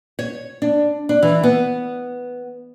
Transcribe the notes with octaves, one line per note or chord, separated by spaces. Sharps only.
C#5
D4
D4
E3
B3